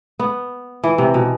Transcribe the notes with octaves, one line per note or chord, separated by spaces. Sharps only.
B3
E3
C3
B2